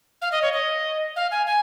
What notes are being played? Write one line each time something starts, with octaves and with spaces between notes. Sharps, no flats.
F5
D#5
C#5
D#5
F5
G#5
G#5